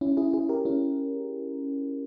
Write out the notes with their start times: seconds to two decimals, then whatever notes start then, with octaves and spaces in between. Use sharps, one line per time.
0.01 C#4 E4
0.17 E4 G#4
0.33 E4 G#4
0.49 G4 A#4
0.65 C#4 E4